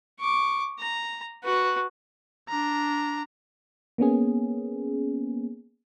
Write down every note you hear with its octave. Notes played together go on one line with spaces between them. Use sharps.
C#6 D6
A#5
F#4 B4
D4 A#5
A#3 B3 C#4 G#4